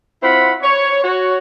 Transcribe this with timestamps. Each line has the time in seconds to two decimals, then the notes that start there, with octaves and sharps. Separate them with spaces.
0.22 C4 E4 F4 F#5 B5
0.63 C#5
1.04 F#4 C#5